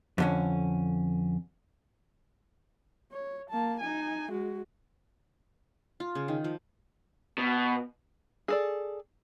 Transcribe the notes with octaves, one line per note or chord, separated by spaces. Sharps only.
F2 D3 C#4
C#5
A#3 A5
D#4 G#5
G#3 F#4
F4
C#3
D#3
F3
B2
G#4 A4 D5